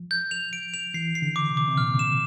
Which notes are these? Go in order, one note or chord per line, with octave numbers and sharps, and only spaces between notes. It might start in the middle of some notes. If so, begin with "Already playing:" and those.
Already playing: F3
G6
F7
D7
F7
E3 C7
C7
D3
D6
C3
D6
C3
A#2 F6
E7